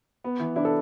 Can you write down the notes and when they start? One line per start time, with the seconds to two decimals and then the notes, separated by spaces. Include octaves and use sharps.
0.24 B3
0.40 E3
0.56 D4 E4
0.65 A4